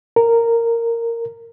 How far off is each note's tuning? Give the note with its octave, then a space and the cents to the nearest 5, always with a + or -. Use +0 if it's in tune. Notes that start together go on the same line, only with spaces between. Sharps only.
A#4 -10